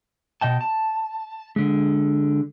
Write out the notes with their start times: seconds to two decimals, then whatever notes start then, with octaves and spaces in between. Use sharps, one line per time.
0.41 B2 D#5 G5 A5
0.61 A5
1.56 D3 G#3